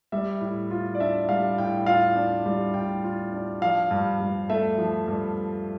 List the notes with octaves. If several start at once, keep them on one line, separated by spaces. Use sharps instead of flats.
G3 E5
A2
F4
D5
D4 E5
G3 F5
A2 G5
F4 F5
D4
G3
A2 G5
F4
D4
F3 F5
G2
G2
A3 E5
F3
G2